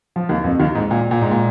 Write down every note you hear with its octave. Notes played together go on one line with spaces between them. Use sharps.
F3
D#2 D#3
F2 F3
D#2 D#3
G#2
A#2
A#2
G#2
A#2